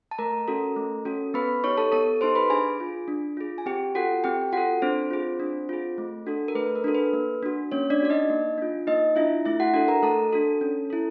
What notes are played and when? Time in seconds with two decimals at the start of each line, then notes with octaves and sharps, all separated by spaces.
0.11 A5
0.18 A3 A#4 A#5
0.48 C#4 F#4 A4
0.76 A3
1.05 C#4 F#4 A4
1.34 B3 B4 B5
1.64 D#4 G4 C#5 C#6
1.77 A4 A5
1.92 B3 A4 A5
2.21 D#4 G4 C5 C6
2.35 B4 B5
2.50 D4 G#4 G#5
2.80 F4 G#4
3.08 D4
3.37 F4 G#4
3.58 G#5
3.66 C4 G4 G5
3.95 F4 F#4 A4 F#5
4.24 C4 G4 G5
4.52 F4 F#4 A4 F#5
4.82 C4 D4 C5
5.10 F4 G#4
5.40 D4
5.69 F4 G#4
5.98 A3
6.26 D4 F#4 A4
6.48 A#4
6.55 A3 B4
6.75 A#4
6.84 D4 F#4 A4
6.95 B4
7.13 A#3
7.43 D4 F#4
7.72 A#3 C#4 C#5
7.90 D4 D5
8.00 D4 F#4 D5
8.10 D#4 D#5
8.30 A#3
8.58 D4 F4
8.87 A#3 D#4 D#5
9.16 D4 E4 F4 E5
9.45 A3 E4 E5
9.60 F#4 F#5
9.74 D4 F#4 A4 F#5
9.88 A#4 A#5
10.03 A3 A4 A5
10.33 D4 F#4 A4
10.61 C#4
10.90 E4 A4